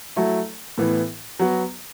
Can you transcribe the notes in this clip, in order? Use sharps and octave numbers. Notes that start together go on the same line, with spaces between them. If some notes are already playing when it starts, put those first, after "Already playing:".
F#3 A3 E4
A2 E3 B3
F#3 B3 F#4